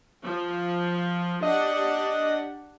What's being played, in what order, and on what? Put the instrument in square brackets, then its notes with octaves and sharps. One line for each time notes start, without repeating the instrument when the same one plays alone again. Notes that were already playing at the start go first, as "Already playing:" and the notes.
[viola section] F3
[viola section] D4 G4 F#5 [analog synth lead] D#5